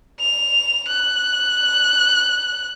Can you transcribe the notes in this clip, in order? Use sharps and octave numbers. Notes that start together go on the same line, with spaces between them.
F7
F#6